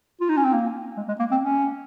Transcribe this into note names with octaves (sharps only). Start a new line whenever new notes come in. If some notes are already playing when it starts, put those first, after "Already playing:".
F4
D#4
C#4
C4
A#3
G#3
G#3
A#3
C4
C#4